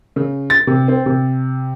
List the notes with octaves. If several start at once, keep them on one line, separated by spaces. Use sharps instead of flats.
C#3
A6
C3
C4
C3